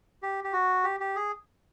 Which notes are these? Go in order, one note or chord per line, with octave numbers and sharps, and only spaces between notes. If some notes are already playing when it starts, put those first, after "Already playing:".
G4
G4
F#4
G4
G4
G#4